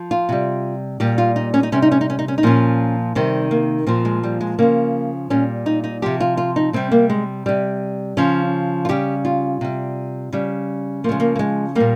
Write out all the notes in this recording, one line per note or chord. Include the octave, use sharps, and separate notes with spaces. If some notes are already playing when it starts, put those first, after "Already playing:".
Already playing: F3
F4
C3 G3
A#2 G3 G4
F4
D#4
C#4
D#4
C3 G3 C#4
D#4
C#4
D#4
C#4
D#4
C#4
D#4
A#2 F3 C#4
C3 D#3 G3 C4
A#3
A#2 F3 C4
G#3
G3
G#3
C#3 F3 A#3
A#2 G3 C#4
D#4
D#4
C3 F3 G4
F4
F4
D#4
C3 G3 C4
A#3
G#3
C3 G3
C#3 F3 C#4
F4
C#3 G3 G4
F4
C3 G3
C#3 G3
C#3 F3 G#3 A#3
A#3
A#3
G#3
A#2 G3 A#3